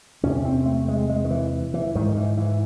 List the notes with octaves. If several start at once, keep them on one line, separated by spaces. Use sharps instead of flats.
E2 C3 C#4
C4
A3
G#3
G#3
D#3
E3
E3
G#2 D#3
E3
E3